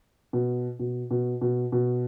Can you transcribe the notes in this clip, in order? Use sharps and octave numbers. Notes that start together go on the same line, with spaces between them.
B2
B2
B2
B2
B2